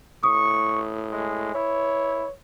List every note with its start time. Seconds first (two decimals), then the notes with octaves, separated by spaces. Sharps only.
0.23 A2 C#6 D#6
1.12 G#3
1.54 E4 C#5